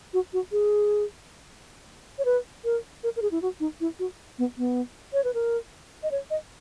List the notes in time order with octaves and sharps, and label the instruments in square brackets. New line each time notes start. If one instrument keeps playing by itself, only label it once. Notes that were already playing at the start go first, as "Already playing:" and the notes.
[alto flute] F#4
F#4
G#4
C#5
B4
A#4
A#4
A#4
G#4
E4
F#4
D#4
E4
F#4
B3
B3
C#5
B4
A#4
D#5
C#5
D#5